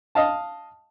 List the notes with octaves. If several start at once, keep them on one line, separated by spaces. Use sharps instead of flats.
D#5 F5 A5